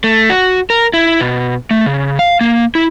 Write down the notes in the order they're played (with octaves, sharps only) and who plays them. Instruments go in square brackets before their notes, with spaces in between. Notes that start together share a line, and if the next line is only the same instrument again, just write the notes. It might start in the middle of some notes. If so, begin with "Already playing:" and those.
[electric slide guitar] A3
F#4
A#4
E4
B2
A3
C#3
F5
A#3
E4